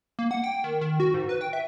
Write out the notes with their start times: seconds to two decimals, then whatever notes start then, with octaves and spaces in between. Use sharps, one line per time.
0.19 A#3
0.31 F#5
0.44 G5
0.64 D#3
0.81 D#3
1.00 F#4
1.14 G#2
1.29 B4
1.41 G5
1.53 E5